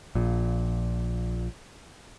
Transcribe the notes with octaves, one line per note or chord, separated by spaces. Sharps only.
A#1 A#2